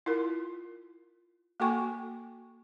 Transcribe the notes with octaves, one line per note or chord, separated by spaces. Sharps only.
E4 F4 A#4
A#3 F#4 A4 G5 G#5 C#6